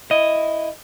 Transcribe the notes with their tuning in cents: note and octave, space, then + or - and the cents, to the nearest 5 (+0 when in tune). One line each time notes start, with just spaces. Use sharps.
E4 +0 D#5 +0